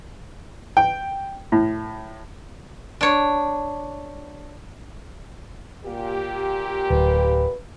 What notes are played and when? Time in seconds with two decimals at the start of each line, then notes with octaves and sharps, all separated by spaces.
0.77 G5
1.52 A2
3.01 D4 C#5
5.85 A#2 A#3 G4
6.90 D1 B4